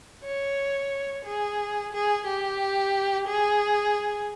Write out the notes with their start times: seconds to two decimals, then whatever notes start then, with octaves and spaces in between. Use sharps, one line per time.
0.24 C#5
1.25 G#4
1.93 G#4
2.27 G4
3.28 G#4